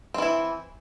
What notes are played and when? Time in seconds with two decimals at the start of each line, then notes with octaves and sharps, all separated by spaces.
0.14 C4
0.18 E3
0.22 E4